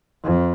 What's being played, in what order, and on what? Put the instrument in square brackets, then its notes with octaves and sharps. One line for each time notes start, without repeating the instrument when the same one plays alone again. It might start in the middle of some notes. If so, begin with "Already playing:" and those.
[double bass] F2